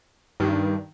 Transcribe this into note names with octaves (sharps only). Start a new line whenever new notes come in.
G2 D#3